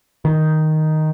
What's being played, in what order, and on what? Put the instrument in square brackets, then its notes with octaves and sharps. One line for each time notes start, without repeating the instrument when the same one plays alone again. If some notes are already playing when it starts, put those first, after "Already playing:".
[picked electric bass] D#3